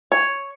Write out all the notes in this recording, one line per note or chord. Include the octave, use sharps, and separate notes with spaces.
C#5